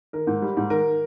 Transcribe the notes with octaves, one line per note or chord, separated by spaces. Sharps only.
D#3 A#4
G#2
G3
G#2
D#3 A#4